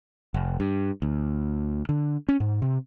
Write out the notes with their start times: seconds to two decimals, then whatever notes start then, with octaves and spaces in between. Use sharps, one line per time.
0.34 F1
0.60 G2
1.02 D2
1.89 D3
2.29 C#4
2.40 G#2
2.62 C3